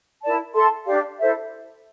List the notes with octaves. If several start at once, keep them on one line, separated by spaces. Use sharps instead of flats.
E4 A#4 D5 A5
A4 E5 A5 C6
D4 G4 D5 F5
E4 A4 C5 E5